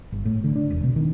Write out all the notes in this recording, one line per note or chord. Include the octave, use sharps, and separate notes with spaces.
G1
A2
D3
D4
E1
B2
D#3